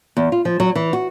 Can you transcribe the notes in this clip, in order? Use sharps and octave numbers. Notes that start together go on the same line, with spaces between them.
E2
F4
F3
F#3
E3
F#4